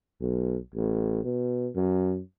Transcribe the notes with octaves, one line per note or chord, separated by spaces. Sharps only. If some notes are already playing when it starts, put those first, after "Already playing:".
B1
A1
B2
F#2